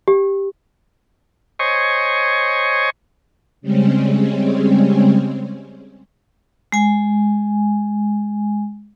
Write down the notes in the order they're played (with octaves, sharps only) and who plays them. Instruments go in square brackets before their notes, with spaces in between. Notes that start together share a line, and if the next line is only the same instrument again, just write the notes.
[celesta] G4
[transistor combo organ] C5 C#5 D#5 G#5 C#6
[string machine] C#3 G3 G#3 C4 C#4
[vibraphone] G#3 G#5